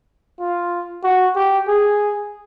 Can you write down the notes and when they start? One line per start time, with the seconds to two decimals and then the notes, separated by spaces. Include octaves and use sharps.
0.40 F4
1.04 F#4
1.36 G4
1.68 G#4